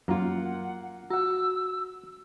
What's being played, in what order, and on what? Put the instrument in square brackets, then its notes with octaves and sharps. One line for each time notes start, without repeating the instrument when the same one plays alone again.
[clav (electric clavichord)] F#2 A#5 [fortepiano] A#3 F4 [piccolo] F#5
[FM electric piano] F#4 [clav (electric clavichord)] F#5 A#5 [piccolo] E6